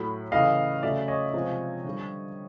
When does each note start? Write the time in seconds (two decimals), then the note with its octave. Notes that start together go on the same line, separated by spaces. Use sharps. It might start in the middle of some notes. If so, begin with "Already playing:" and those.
Already playing: A2 F#3 A3 B5
0.32 C#3 E3 A3 D#5 F5
0.82 C#3 F#3 A3 D5 E5
1.08 C#5 D#5
1.34 C3 F3 G#3
1.84 D3 G3